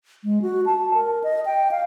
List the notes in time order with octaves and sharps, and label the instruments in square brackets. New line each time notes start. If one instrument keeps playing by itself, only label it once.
[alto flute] G#3
F#4
A5
A#4
D#5
G5
F5